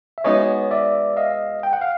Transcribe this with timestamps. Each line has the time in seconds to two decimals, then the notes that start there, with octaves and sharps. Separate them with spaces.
0.18 E5
0.24 G#3 B3 D#4 F#4 C#5 D#5
0.71 D5 E5
1.17 D#5 F5
1.63 G5
1.73 F#5
1.81 F5